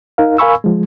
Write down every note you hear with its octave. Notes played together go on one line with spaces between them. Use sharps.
D#4 A#4 F5
A#4 F5 G#5 B5 C#6 E6
F3 G#3